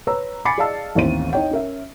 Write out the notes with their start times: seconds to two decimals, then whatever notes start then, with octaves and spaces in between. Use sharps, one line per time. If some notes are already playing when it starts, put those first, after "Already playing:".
0.07 B4 C#5 A#5 E6
0.45 G#5 B5 D6 A6 C7 C#7
0.58 G#4 D5 D#5 F5 A5 E6
0.95 A1 D#2 C4 C5 D#7
1.33 D#4 C#5 G5
1.51 C#4 A#4 E5